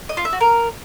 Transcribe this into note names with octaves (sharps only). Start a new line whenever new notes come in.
D#5
F4
E5
F#4
A#4